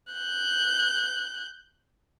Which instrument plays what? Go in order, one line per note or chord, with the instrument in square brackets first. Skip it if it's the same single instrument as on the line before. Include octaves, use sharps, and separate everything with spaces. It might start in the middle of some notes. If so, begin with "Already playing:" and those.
[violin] F#6 G6